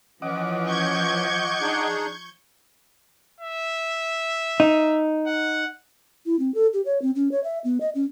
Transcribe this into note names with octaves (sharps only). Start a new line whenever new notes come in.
E3 F3 C#4 D#5 F#5 D6
C#6 G6 G#6
D4 D#4 G#4
E5
D#4
F#5
E4
C4
A4
G4
C#5
C4
C#4
C#5
E5
B3
D#5
C#4